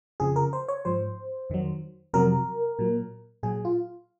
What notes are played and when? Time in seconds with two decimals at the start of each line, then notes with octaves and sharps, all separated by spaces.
0.20 F2 C#3 F3 G#4
0.36 A#4
0.53 C5
0.68 C#5
0.85 G#2 F3 C5
1.50 F2 D#3 F#3
2.14 F2 C3 F#3 A#4
2.79 A#2 F#3
3.43 A#2 F#3 G#4
3.65 F4